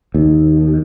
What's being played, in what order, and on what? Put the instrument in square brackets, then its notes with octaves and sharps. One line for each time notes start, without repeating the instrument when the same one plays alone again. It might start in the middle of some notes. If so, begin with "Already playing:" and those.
[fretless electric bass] D#2